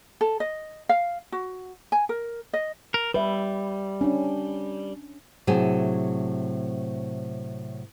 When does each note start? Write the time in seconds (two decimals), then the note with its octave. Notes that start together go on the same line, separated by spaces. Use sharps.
0.21 A4
0.40 D#5
0.89 F5
1.32 F#4
1.92 G#5
2.09 A#4
2.53 D#5
2.94 A#4
3.14 G3 B4 E5
4.01 C#4 D4
5.47 A2 C3 F#3 G#4 E5 G#5